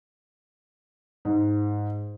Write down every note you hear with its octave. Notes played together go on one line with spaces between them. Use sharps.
G#2